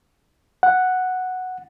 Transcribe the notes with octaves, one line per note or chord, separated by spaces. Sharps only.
F#5